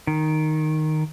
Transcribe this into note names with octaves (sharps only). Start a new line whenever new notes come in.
D#3